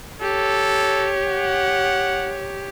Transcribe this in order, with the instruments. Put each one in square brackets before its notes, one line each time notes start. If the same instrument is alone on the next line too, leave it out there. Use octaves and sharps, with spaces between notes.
[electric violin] G4 [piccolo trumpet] A4 [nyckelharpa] C#5
[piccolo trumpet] F#5